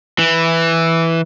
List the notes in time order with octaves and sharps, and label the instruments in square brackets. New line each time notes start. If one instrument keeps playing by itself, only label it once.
[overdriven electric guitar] E3